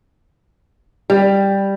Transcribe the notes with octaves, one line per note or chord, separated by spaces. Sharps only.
G3